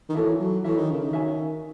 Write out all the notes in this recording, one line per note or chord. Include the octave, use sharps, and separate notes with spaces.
D#3
E3 F#4 A4 C#5 E5
F#3
E3 F#4 A4 C#5 E5
D#3
C#3
D#3
F#4 C#5 E5 G#5